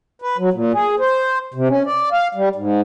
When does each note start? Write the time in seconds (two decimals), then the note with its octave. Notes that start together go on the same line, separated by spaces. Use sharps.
0.22 B4
0.38 F#3
0.53 A#2
0.74 G#4
1.00 C5
1.54 C3
1.69 C#4
1.86 D5
2.12 F5
2.35 G3
2.56 G#2